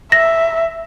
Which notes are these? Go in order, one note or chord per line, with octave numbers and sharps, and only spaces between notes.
E5 A#6